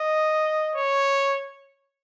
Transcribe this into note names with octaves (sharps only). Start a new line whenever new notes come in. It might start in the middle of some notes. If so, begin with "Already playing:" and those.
Already playing: D#5
C#5